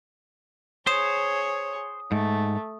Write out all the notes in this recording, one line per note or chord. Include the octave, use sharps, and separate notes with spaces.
G#4 C5 C#5 D#6
G#2 A3